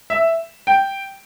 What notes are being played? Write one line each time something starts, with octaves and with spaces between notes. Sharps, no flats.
E5
G5